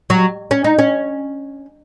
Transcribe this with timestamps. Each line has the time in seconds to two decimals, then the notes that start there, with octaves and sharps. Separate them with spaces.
0.10 F#3
0.51 C#4
0.64 D#4
0.79 C#4